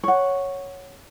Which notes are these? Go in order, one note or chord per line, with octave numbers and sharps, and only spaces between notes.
C#5 F#5